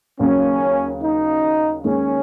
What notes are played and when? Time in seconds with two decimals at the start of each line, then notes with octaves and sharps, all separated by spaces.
0.19 D#2 C#3 F#3 C#4
1.03 D#4
1.84 D#2 D#3 G#3 C#4 D#4